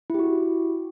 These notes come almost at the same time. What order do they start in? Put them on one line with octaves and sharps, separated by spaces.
E4 G4 F#4